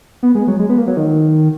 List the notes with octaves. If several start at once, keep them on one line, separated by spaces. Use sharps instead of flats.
B3
G#3
F#3
G#3
B3
A#3
F#3
D#3